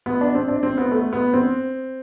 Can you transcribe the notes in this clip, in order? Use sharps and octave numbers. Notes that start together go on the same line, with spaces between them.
B3
D4
C4
D4
C4
B3
A3
B3
C4